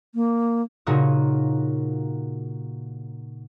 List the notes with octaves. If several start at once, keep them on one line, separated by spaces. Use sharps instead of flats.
A#3
A#2 C#3 A#3 D#4 F#4 D#6